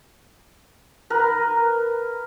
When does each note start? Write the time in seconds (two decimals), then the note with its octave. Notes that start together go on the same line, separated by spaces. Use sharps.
1.10 A#4 B4